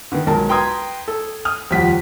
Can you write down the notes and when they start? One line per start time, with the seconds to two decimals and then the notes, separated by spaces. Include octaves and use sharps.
0.12 D3 D#3 B3
0.27 B1 G#3 A#4 A5
0.49 B4 G5 A#5 C6 D#6 G#6
1.08 A4
1.45 D#6 F6
1.70 D#1 F2 F3 G3 F#5 B6